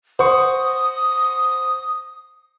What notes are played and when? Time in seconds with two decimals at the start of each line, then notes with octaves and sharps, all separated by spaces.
0.19 C5 F#5 C#6 D#6